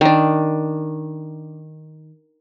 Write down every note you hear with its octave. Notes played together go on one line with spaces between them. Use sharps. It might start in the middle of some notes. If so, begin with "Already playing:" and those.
D#3 D4